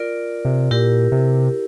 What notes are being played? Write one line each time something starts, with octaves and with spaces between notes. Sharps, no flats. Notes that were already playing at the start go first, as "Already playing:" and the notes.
Already playing: F4 A#4 D5
C3
A#2 E4 G4 A#4
C3